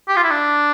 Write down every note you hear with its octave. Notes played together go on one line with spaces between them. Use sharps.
G4
F4
E4
D4